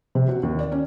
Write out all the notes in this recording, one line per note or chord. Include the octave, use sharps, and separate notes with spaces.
C3
F#4
D#2
D5
C#4